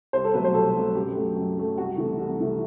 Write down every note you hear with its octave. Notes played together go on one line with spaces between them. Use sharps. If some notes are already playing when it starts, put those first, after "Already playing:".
C2 C5
A4
B2 F#3 A3 B4
C5
C2 A4
B2 F#3 A3
F#2 G4
F#3 A3
F#2
F#3 A3
C2 F#4
C3 E3 A3
C2
C3 E3 A3